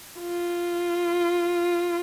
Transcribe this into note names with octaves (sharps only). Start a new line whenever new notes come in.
F4